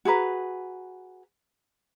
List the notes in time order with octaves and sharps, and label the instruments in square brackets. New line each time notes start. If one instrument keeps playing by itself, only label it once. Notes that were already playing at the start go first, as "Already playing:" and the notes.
[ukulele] F#4 G#4 B4 A#5